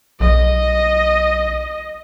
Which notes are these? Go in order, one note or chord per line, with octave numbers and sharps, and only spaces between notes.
B1 D#5